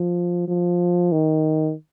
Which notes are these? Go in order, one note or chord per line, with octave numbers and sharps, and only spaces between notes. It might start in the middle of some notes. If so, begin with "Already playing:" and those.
Already playing: F3
F3
D#3